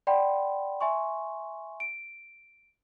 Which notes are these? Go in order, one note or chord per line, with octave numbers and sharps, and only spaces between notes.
D5 F#5 G5 B5 C6
E5 G#5 C6 C#6
D7